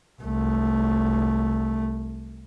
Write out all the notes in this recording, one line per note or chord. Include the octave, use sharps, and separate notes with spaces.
C2 A3